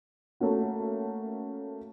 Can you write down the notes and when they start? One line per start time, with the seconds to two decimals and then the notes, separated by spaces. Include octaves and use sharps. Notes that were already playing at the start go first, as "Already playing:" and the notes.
0.40 A3 A#3 C#4 F#4